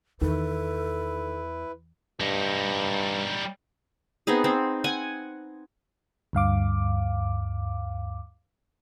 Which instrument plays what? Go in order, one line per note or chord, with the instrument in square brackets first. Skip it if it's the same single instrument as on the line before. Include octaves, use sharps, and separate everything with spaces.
[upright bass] E2 [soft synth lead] D#3 [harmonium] E4 B4 [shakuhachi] A4
[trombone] G2 [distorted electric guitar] G3 D#4
[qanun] B3 C4 D#4 G#4
C4
F#5 G#5
[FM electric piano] D2 G2 F5 D6